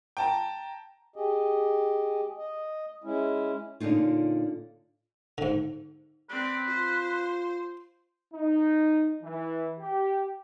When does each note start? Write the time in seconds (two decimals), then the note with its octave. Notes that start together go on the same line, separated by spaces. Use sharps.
0.17 G5 A5 A#5
1.16 G4 G#4 D#5
2.38 D#5
3.04 G#3 C#4 E4
3.80 A#2 D3 C#4 D#4 F4
5.38 G#2 D3
6.30 C4 B4 D5
6.67 F4 C5
8.34 D#4
9.23 E3
9.80 G4